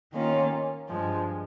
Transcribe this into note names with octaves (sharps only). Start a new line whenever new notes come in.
D#3 A#3 C#4 F4
G2 F3 G#3